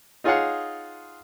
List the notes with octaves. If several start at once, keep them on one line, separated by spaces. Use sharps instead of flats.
D#4 F4 G#4 C#5 F5 F#5